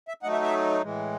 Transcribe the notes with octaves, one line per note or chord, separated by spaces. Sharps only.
E5
F#3 A3 D#4 F#5
E5
E5
A2 E3 G#3